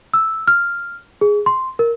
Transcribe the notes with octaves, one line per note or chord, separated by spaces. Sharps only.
E6
F6
G#4
C6
A#4